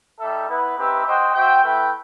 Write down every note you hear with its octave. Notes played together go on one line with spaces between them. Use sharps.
G3 D#4 A4 E5
B3 E4 B4
C4 D#4 G4 B4 E5
F#4 C5 D#5 G5
F#4 C5 E5 G5
A3 E4 B4 E5 G5